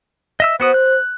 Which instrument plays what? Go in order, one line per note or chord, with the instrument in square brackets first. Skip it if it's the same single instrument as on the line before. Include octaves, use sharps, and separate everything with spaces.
[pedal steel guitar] D#5 E5 E6
[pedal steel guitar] B3 F#4 D#6 [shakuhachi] C5
[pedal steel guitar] F#6